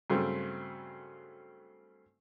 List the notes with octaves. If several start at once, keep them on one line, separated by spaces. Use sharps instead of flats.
G2 C#3 F#3 A3 C4